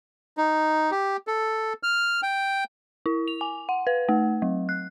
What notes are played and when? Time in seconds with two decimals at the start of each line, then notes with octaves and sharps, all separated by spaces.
0.37 D#4
0.91 G4
1.27 A4
1.83 F6
2.23 G5
3.06 E4
3.28 F7
3.41 G#5
3.69 F#5
3.87 B4
4.09 A3
4.42 F#3
4.69 F#6